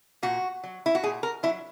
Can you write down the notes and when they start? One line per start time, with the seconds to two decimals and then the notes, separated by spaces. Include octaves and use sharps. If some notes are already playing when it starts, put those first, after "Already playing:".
0.23 A#2 F#4
0.64 F#3
0.86 E4
0.95 F#4
1.04 A#2 G#4
1.23 A#4
1.43 F#3 E4